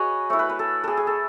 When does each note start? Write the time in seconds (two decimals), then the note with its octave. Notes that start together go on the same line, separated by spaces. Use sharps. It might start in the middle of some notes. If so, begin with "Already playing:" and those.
Already playing: F#4 G#4 B4 C#5 D#5
0.30 A3 E4 C#5
0.39 B4
0.49 B4
0.59 A4
0.84 G#4 A4
0.97 G#4
1.07 A4